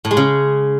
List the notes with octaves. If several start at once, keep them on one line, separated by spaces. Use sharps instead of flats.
A2
G#3
C#3